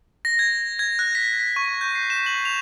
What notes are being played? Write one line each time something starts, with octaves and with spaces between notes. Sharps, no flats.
A#6
G#6
G#6
F#6
B6
B6
C#6
G6
C7
E7
F#7
F7